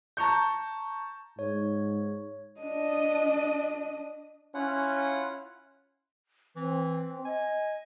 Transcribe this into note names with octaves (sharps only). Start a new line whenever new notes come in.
A5 A#5 C#6 G6
G#2 C#5
D4 D#5
C#4 E4 F4 F#5
E3 C4
D#5 G#5